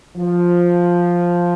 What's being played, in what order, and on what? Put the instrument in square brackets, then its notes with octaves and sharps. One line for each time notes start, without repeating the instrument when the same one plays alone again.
[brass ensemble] F3